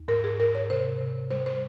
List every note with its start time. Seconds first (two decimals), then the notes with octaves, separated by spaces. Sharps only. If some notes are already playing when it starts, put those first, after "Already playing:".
Already playing: D#2
0.08 G#2 A#4
0.24 G#4
0.39 G#2 A#4
0.55 C#5
0.70 C3 C5
1.01 C3
1.31 G3 C5
1.46 C5